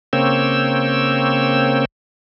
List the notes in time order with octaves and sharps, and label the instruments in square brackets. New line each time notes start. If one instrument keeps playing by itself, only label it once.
[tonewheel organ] C#3 A#3 C4 C#5 G5 E6